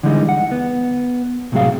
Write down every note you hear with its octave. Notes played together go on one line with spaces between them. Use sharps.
D3 E3 G3 G#3 D#4
F#5
B3
C2 A2 C3 F#3 G#4 F5